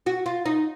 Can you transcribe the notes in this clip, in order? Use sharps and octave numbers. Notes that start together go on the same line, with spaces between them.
F#4
F4
D#4